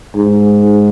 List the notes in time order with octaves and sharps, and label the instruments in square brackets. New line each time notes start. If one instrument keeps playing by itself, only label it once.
[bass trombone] G#2